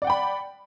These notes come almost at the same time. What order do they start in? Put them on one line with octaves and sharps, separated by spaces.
D5 F#5 G5 B5